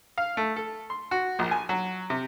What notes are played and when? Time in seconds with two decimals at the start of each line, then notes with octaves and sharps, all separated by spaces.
0.18 F5
0.37 A3
0.56 A4
0.90 C6
1.11 F#4
1.39 A#1
1.51 G#5
1.69 F#3
2.10 C3